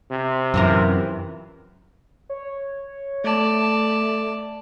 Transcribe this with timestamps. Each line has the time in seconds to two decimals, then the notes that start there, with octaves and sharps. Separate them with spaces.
0.11 C3
0.54 F#2 E3 F4 A#4
2.30 C#5
3.24 A3 D5 A5